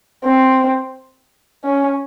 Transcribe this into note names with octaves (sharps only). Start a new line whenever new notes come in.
C4
C#4